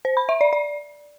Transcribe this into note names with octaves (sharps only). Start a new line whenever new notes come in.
C5
B5
E5
D5
D5